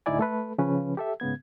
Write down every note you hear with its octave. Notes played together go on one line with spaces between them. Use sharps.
D2 A2 D#4 E4 D5 G#5
A3 A4 B4
C#3 F3 C#4 B4
G4 A4 E5
G#2 C#3 B3 G#6